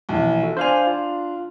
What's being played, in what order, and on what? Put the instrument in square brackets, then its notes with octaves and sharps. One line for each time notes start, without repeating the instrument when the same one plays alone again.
[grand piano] A#1 E3 [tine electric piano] B2
[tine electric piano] F4 F#4 A4
[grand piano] D4 F7 [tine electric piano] C5 F5 G#5
[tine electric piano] F4